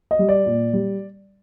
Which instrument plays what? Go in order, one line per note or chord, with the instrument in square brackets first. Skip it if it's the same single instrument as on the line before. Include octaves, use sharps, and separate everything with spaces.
[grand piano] D#5
G3
D5
A#2
G3